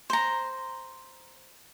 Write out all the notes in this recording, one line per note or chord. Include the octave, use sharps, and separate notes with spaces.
C5 A#5